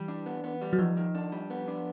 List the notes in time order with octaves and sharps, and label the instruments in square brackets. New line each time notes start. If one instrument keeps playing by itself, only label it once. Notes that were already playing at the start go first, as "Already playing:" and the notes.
Already playing: [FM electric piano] E3 [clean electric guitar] G3
[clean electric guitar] D4
B3
B3
G3
[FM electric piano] F#3
[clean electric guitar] D#3 [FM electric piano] F3
[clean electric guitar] D#3
D4
G3
B3
D4